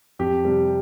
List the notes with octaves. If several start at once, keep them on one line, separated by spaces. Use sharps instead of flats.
F2 G4
C3 G3